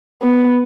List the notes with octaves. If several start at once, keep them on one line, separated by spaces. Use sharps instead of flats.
B3